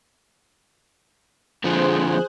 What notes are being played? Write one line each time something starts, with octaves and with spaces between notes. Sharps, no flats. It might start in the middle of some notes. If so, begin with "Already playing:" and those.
F2 D3 F3 G#4 C5 F#6